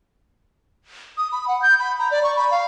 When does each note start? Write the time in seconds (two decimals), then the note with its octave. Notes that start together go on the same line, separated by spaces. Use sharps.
1.17 D#6
1.32 B5
1.48 F#5
1.62 G6
1.79 B5
1.99 A#5
2.11 D5
2.24 C#6
2.36 B5
2.51 F5